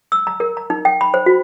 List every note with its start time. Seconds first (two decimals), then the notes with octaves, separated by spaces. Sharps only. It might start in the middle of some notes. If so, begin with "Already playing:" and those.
0.12 E6
0.27 A#5
0.40 A#4
0.57 A#5
0.70 D#4
0.85 G5
1.01 B5
1.14 C5
1.26 F#4